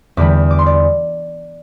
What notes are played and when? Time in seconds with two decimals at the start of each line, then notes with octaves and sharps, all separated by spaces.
0.17 E2 D3 G3 D6
0.51 D6
0.59 C6
0.66 D5